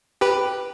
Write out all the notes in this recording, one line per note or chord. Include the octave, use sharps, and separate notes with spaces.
G4 B4